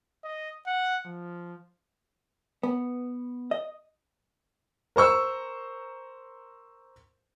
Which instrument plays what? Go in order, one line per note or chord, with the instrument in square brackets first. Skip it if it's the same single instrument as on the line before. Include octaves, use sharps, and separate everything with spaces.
[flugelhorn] D#5
F#5
F3
[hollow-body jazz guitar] B3
D#5
[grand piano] A#4 C5 C#6 E6